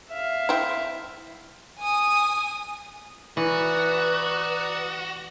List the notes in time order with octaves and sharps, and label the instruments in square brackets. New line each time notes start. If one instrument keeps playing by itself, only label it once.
[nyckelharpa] E5 F5
[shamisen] C4 E4
[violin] G#5 D#6
[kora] E3 [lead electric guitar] F#4 [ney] B4 [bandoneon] D5 A#5 D#6